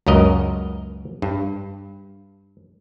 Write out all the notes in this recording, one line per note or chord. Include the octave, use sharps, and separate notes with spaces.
C#2 F#2 A#4 D#5
G2